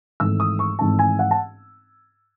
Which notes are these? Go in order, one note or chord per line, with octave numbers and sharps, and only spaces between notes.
G#1 G#2 E3 A3 E6
D#6
C#6
G#1 G#2 E3 A3 A5
G#5
F#5
A5